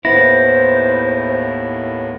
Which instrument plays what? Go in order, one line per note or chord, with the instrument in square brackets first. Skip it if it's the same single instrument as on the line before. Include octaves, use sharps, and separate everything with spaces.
[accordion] D#2 A2 [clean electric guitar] B3 E4 [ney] C5 [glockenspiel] A#6